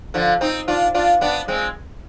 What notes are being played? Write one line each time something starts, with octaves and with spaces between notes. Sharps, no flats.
D3 F3
C4 D#4
D4 F4
D4 F4
B3 D4
G#3 C4